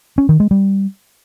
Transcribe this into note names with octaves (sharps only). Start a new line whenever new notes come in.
C#4
D#3
G#3
G3